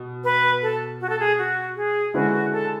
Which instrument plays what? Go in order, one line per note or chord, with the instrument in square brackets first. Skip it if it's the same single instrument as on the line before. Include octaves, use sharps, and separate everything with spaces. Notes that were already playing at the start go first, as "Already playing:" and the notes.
Already playing: [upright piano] B2
[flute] B4
A4
F#4
A4
G#4
F#4
G#4
[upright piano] D3 G#3 C#4 E4 B4 [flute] F#4
[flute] F#4
A4